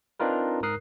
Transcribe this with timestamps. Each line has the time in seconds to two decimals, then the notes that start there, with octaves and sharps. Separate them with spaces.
0.20 C4 D4 D#4 F4 A#4 B4
0.63 G#2 A#4 D#6 F#6 C7